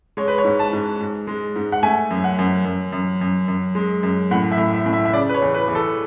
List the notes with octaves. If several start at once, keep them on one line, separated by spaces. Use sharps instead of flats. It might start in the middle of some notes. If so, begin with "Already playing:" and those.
G#3 C#5
B4
C#5
G#2
A5
G#2
G#2
G#3
G#2
F#5
A3 G#5
F#2
F#5
F#2
F#2
F#2
F#2
F#2
G#3
F#2
A2 F#5
E5
A2
E5
A2
E5
E5
C#3 D5
B4
C#5
E2
B4
E2
A4